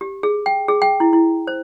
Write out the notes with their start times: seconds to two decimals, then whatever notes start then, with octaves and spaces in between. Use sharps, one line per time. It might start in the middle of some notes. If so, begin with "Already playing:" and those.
0.01 G4
0.23 G#4
0.46 G5
0.68 G#4
0.82 G5
1.00 E4
1.13 E4
1.47 C5